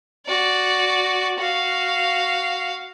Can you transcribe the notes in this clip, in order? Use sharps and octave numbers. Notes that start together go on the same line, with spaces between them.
F#4 D5
F#4 F5